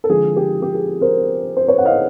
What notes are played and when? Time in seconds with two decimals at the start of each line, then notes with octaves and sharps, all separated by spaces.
0.04 A4
0.09 D3 F3 G#3 G#4
0.36 G4
0.62 G4
0.75 G#4
1.01 A#4 C5
1.57 C5
1.68 B4 C#5
1.78 F#5
1.85 D#5 F5